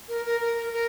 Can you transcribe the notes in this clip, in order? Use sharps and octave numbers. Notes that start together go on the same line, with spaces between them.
A#4
A#4
A#4
A#4